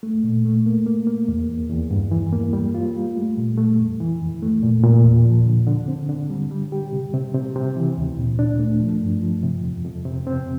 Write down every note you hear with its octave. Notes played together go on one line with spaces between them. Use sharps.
A3
A#2
A3
A#3
A#3
A#3
E2
E2
E2
G2
E3
A#3
G3
F4
G3
A3
A#2
A3
F2
E3
F2
A3
A#2
A#2
E2
F3
D3
D3
C4
D3
G3
G3
G4
C3
C3
C3
C3
E3
D2
A#2
D4
A3
F3
G2
F3
C3
F2
F2
C3
C4